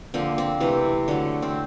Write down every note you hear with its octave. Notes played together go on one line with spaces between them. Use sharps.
D3 F3 A#3 C4
C4
C3 E3 A3
D3 F#3 A3
C4